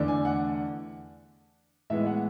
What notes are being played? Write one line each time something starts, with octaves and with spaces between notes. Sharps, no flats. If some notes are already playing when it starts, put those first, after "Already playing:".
Already playing: E2 D3 A3 D4
G#5
F#5
A2 E3 G#3 B3 E5
F#5